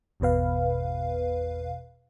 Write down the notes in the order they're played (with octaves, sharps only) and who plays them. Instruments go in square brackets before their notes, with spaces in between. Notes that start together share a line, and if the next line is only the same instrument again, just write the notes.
[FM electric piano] G#1 E2 B2 B4 F5